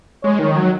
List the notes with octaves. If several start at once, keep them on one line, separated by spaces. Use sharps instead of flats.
G#3 C#5
D#3
F#3